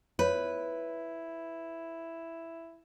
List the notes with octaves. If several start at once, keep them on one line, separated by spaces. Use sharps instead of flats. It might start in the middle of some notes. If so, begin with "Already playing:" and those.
E4 F4 B4 C#5